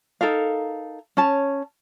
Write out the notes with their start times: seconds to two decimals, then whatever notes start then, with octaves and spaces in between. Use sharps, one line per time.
0.21 D#4 A4 A#4 F5
1.17 C#4 C#5 A5